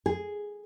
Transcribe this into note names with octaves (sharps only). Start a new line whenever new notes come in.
G#4